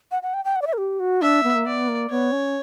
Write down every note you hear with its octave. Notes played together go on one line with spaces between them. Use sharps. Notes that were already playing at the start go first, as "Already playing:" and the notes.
F#5
F#5
G5
G5
F#5
D5
E5
A#4
G4
F#4
D4 E5
B3
A#3
B3 D5
A#3
B3 C#5
C#4